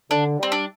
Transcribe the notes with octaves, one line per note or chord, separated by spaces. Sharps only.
D3 D4
G3 C4
D4